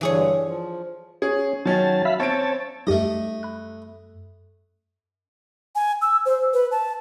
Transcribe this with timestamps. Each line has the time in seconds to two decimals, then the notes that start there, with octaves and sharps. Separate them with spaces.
0.01 G2 D3 E3 G#4 C#5
0.44 F3
1.22 C#4 G#4
1.65 D#3 F#3 C#4 A5
2.05 E5 F5 B5
2.20 C4 C#4 C#5 A5 D7
2.87 F#2 G3 A3 D#4 G4 D#5
3.43 B5 F#6
5.75 G#5
6.02 E6
6.26 C5
6.54 B4
6.71 A5